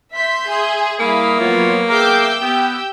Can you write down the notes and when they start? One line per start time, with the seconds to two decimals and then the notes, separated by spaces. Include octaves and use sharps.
0.13 E5 C6 G6 B6
0.48 G#4
1.00 G3 A#3 E4 F5 B5 D#6
1.40 F#3 B3 F4 C#5
1.89 G#4 A#4 E5 G5 D6 E6 G6 C7
2.42 B3 G4